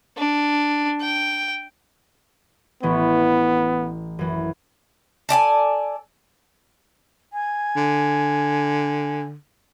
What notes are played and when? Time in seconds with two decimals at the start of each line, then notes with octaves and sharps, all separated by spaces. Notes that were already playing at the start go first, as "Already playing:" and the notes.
0.17 D4
1.01 G5
2.83 A1 E3 B3 C#4
4.19 F#2 E3
5.29 A4 D5 G5 G#5
7.33 G#5
7.76 D3